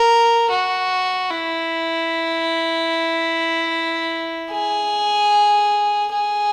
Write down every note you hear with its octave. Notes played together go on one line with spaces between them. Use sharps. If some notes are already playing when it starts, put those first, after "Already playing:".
Already playing: A#4
F#4
E4
G#4
G#4